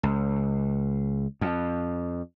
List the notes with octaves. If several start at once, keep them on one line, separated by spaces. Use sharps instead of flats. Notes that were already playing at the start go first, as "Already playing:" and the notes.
C#2
F2